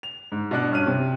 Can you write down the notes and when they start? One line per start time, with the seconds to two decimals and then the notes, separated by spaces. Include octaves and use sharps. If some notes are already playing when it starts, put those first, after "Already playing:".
0.03 F7
0.32 G#2
0.51 B2 B3 D4 D6 F#6
0.71 G2 C#4 F6 F#6 D#7
0.87 C3